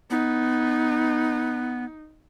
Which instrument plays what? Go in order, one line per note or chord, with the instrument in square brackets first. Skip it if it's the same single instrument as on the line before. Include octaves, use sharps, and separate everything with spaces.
[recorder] B3 [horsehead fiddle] D#4